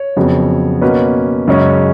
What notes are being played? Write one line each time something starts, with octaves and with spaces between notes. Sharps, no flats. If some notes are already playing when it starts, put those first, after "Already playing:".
Already playing: C#5
F2 C#3 F#3 B3
B2 A#3 C#4 B4
F#2 C#3 G#3 C#4